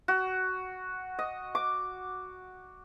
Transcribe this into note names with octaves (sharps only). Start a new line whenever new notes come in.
F#4
D#5
D6